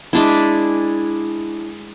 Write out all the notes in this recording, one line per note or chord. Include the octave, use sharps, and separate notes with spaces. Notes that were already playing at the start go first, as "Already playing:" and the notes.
G#3 D4 E4